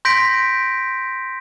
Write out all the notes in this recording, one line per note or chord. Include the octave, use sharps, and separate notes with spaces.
C6 G6 A#6 B6 D7